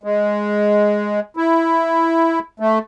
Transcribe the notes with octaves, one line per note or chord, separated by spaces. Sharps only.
G#3
E4
A3